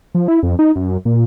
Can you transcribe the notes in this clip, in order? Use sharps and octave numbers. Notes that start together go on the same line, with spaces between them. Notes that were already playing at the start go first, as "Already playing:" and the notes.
F3
E4
F2
D#4
F#2
A#2